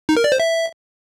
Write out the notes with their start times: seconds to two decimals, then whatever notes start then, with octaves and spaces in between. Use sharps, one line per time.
0.09 D#4
0.17 A#4
0.24 D5
0.32 C5
0.40 E5